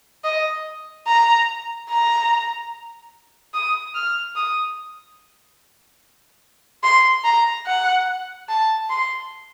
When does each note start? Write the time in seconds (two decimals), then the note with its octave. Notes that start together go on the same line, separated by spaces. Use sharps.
0.24 D#5
1.07 A#5
1.89 A#5
3.54 D#6
3.95 F6
4.36 D#6
6.83 C6
7.24 A#5
7.66 F#5
8.49 A5
8.90 C6